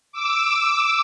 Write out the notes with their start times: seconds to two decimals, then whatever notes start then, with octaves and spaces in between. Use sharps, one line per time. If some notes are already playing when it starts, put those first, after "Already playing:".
0.12 D6 E6